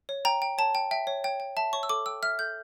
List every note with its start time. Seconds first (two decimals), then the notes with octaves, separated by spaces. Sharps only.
0.09 C#5
0.25 G5 A#5
0.42 G5
0.58 C#5 A5
0.75 G5
0.91 E5 G5
1.07 C#5
1.24 C#5 G5
1.40 G5
1.57 E5 A5
1.73 C#5 C#6
1.83 E6
1.89 A4 D6
2.06 G5 E6
2.23 E5 F6
2.39 A4 G6